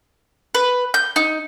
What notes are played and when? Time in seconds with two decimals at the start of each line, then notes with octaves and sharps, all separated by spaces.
0.55 B4
0.94 G6
1.16 D#4